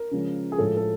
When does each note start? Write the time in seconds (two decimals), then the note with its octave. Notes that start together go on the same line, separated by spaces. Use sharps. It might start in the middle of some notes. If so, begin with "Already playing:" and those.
Already playing: A#4
0.11 C#3 F3 G#3
0.52 G#4
0.58 A2 F3 G#3 A4
0.77 A4